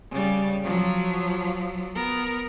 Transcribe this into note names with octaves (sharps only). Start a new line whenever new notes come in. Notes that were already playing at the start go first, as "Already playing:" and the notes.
C#3 G3
F3 F#3
B3 A#4